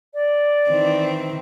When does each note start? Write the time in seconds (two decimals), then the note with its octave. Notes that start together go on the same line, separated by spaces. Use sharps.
0.14 D5
0.69 D#3 E3 C4